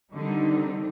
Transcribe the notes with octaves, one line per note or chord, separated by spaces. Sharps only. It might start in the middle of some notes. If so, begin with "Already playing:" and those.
D3 D#3 G3 C4 D#4